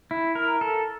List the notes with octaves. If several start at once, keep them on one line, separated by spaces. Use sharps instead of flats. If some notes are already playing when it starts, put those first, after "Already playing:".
E4
A#4
A4